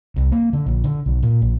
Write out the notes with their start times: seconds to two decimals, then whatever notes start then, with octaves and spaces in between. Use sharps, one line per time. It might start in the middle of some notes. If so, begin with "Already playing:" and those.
0.16 C2
0.32 A#3
0.53 D3
0.66 A#1
0.84 D3
1.06 B1
1.22 A#2
1.42 A#1